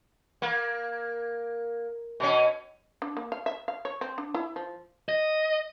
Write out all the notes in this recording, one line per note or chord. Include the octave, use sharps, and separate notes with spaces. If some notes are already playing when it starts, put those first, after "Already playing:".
A#3
B2 C#4
D4
A#3
F5
E5
F5
C#5
C4
D4
E4
F3
D#5